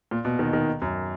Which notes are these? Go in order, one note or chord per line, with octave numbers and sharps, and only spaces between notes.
A#2
B2
D#3
D#3
F#2